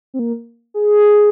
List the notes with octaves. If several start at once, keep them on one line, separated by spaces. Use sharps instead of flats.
C4
A#3
G#4